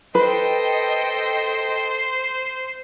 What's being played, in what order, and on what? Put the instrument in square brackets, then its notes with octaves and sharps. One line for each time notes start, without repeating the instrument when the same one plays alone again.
[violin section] A4 D#5 G5 [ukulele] B4 [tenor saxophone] C5